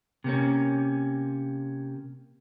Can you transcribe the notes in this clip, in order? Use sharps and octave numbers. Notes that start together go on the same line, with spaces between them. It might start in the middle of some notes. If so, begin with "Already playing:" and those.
C3 A#3 C#4